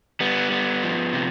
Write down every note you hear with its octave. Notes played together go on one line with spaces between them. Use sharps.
G3 B3
B3
F3
C3